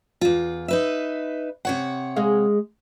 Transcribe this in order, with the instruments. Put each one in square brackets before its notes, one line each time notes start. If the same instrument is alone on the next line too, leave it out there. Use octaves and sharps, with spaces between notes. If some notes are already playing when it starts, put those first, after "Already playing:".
[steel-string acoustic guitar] E2 F4
D#4 B4 E5
C3 C#5 F#5
[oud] G#3 G#4 F5